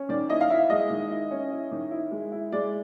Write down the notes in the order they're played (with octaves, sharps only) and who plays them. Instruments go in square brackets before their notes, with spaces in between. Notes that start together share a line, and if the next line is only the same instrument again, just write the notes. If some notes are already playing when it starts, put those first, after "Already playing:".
Already playing: [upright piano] C#4
D#3 D5
E4 D#5
F5
E4 E5
G#3 D#5
D#3
E4
C#4
E4
D#3
E4
G#3
E4
G#3 D5